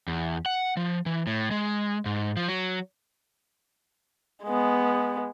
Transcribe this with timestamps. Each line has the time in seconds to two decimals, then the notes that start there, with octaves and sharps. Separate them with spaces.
0.08 E2
0.46 F#5
0.77 F3
1.06 E3
1.27 A2
1.51 G#3
2.06 G#2
2.37 F3
2.48 F#3
4.44 G#3 B3